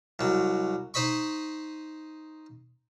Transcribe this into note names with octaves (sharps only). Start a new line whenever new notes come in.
C2 F#3
D#4 C5 D#5 B5 C#6